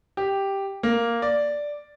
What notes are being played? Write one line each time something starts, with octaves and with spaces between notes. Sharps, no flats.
G4
A#3
D5